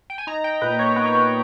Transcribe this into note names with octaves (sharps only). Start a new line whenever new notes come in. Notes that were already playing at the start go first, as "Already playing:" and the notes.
G5
G#5
D#4 A#5
G5
A#2 B4
C#5
B3 B4
C#5
B4